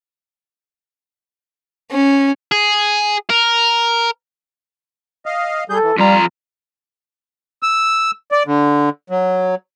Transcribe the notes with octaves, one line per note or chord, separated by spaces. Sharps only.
C#4
G#4
A#4
D#5 F5
G3 G#4 A4 G6
E3
F2 G3 F4 A#5
E6
D5
D3
F#3